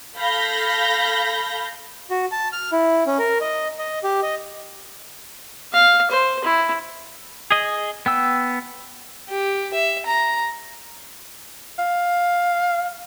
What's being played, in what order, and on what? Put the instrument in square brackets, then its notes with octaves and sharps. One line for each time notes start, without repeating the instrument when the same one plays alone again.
[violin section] A4 F5 B5 G6 A#6
[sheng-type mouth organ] F#4
A5
F6
E4
C#4
A#4
D#5
D#5
G4
D#5
[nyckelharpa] F5
C5
E4
[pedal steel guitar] G#4 D#5
B3 G5 E6
[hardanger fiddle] G4
E5
A#5
[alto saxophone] F5